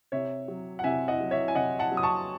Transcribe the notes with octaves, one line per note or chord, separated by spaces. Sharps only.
C3 C#5 E5
F#3
F#5
C3 E5 G#5
D#5 F#5
F#3
C#5 E5
G#5
C3 D#5 F#5
F#5 A5
F#3
D#6
A5 C#6